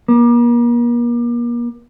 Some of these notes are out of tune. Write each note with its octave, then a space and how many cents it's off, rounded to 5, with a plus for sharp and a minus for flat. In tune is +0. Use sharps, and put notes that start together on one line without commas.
A#3 +40